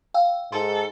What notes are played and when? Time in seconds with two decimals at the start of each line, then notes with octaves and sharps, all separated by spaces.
0.14 F5 G5 E6
0.52 G#2 A4 C6